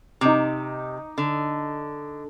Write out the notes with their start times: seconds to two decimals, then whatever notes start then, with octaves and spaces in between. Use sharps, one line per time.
0.21 C3 D#4 D6
1.18 D3